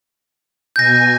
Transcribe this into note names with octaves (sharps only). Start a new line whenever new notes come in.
B2 G#5 G6 A#6